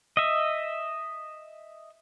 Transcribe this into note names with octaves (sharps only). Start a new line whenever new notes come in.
D#5 E5